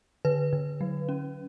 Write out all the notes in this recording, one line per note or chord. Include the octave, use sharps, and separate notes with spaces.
D3 B4
D3
F#3
C#4